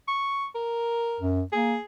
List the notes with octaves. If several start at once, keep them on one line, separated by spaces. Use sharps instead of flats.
C#6
A#4
F#2
A#3 G#4